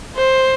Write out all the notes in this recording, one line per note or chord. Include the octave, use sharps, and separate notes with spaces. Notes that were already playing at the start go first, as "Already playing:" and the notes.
C5